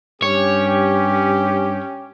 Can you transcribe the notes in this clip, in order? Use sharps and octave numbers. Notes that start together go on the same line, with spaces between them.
G2 C#4 G4 C#5